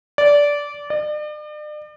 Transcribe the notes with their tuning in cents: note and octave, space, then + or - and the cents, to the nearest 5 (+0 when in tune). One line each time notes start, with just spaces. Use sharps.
D5 -15
D5 +40